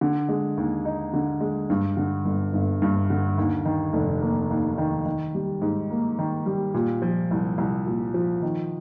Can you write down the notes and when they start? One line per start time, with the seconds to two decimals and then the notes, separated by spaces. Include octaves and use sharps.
0.01 D3
0.29 G#3
0.57 D#2
0.85 D#4
1.13 D3
1.41 G#3
1.70 G2
1.97 D3
2.25 G1
2.53 G1
2.82 G2
3.10 D3
3.38 D#2
3.65 D#3
3.93 F1
4.21 A#3
4.50 D#2
4.78 D#3
5.06 D#3
5.35 G3
5.62 G#2
5.90 A#3
6.19 D#3
6.46 G3
6.74 A#2
7.02 F3
7.31 C2
7.58 C2
7.86 A#2
8.14 F3
8.42 D#3